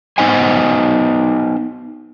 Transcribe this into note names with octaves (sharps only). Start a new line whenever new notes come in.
B3 D#4 C5 D#5 G#5